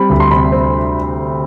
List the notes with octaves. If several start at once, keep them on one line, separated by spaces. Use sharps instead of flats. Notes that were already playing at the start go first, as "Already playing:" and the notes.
Already playing: G3 C4 B5
D2
C6
C3 B5
C4